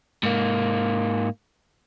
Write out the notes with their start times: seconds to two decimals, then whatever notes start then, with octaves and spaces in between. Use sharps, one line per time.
0.23 G#2 A#3